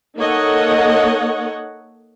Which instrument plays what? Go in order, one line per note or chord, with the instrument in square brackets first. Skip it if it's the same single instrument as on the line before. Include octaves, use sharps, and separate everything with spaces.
[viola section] A#3 D#4 A4 C#5 D#5 F#5